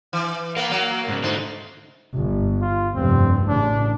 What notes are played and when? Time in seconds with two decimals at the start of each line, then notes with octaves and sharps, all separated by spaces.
0.13 E3
0.57 A#3 B3 A#4 F5
0.70 F#3 A#3
1.08 G#2 C#3
1.23 D3 A3 D#4 C5
2.14 G1
2.62 F4
2.95 F1 G2 C4
3.48 A1 C#3 D4